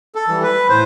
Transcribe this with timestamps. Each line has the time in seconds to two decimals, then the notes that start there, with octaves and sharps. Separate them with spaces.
0.15 A4
0.28 E3 G3
0.43 B4
0.69 A2 C5